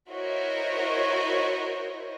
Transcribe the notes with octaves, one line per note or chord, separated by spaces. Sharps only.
E4 F#4 A#4 C5 C#5 D#5